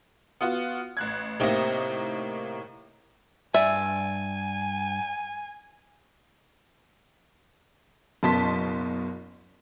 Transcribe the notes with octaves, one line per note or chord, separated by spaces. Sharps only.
B3 F4 F#4
A1 F#6 G#6
A2 C3 A#3 D#4 D#5
G2 D5 E5 G#5
F#1 B2 A5 C6 B6